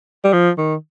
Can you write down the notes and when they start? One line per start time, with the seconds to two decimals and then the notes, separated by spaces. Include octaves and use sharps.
0.24 G3
0.33 F3
0.58 D#3